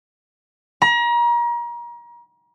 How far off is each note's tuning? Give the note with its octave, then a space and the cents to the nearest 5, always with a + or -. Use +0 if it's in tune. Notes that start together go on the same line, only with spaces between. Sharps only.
A#5 +35